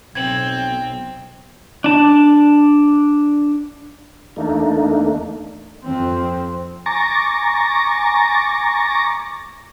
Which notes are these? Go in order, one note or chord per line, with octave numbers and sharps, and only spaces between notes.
B1 C4 G#6 F#7
D4 A5
E2 A3 A#3 D4 D#4
F2 C4
G#5 A#5 C#6 D6 A6 A#6